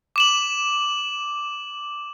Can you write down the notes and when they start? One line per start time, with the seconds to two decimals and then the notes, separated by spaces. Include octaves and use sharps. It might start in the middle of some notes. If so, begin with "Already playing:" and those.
0.16 D6 E7 F#7